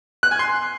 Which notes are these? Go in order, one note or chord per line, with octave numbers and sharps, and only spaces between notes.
F#6
G#5
C6